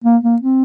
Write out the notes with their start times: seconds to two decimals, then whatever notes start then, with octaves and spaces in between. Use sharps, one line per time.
0.04 A#3
0.24 A#3
0.42 C4